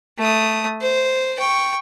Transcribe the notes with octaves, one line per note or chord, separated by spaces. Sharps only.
A3 D#6
C5
G5 C#6